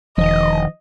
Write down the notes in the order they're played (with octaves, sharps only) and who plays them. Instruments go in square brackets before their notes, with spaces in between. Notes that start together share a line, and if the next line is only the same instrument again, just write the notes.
[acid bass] E1 [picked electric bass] D#3 F3 [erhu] D#5